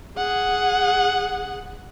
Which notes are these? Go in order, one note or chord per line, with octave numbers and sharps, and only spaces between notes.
G#4 F#5